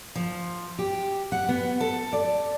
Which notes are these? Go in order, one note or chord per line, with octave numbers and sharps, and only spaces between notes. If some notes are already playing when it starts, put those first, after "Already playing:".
F3
G4
F#5
B3
A4
D5